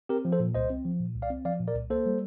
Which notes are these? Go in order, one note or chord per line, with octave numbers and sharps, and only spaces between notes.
C4 G4 A#4
F3
A4 C5
A#2
C2 C5 D#5
C4
F3
A#2
C2
D5 F5
C4
F3 D5 F5
A#2
A#4 D5
C2
A#3 A4 C5
G3